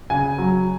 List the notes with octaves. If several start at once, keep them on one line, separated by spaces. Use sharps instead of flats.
C#3 G#5
F#3